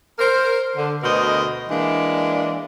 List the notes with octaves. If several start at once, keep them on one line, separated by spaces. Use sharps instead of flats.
A#4 C5
D3
D2 B2 A#4 C5 D#5
E3 G#3 A#3 D4